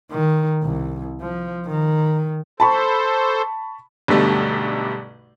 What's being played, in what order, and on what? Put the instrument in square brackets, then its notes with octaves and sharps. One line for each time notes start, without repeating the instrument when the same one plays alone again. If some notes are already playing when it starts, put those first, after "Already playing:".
[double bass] D#3
C2
F3
D#3
[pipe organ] A4 C5 [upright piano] A5 B5 C#6
[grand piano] B1 G2 B2 D3 G3 A3